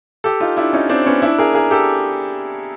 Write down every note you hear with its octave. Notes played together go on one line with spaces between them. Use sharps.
G4 A4
D#4 F4
D4 E4
C#4 D#4
C4 D4
B3 C#4
D4 E4
G#4 A#4
G#4 A#4
G4 A4